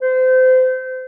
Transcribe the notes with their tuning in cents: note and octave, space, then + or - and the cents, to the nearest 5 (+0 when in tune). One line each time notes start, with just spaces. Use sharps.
C5 -30